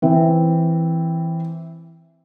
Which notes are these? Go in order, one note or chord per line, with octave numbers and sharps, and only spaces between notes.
E3 C4